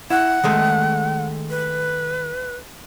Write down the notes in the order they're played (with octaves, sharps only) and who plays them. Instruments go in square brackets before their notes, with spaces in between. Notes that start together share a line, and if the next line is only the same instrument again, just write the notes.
[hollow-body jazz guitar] E4 [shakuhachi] F#5
[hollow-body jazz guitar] D#3 G#3 A3
[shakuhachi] B4